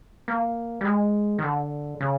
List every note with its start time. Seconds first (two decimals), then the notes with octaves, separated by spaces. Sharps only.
0.28 A#3
0.81 G3
0.85 G#3
1.39 D#3
1.43 D3
2.01 C#3